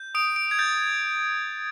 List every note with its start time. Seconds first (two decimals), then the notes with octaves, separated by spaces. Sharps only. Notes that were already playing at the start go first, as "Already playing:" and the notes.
Already playing: G6
0.15 D#6 D7
0.36 D7
0.51 G#6
0.59 G6 A6